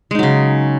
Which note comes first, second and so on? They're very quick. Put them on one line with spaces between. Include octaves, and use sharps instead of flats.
G#3 D#4 F#3 C#3